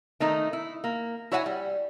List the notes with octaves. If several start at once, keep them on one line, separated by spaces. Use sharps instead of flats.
D#3 A3 D#4
E4
A#3
E4 F#4 C#5 E5 F#5 G#5
G3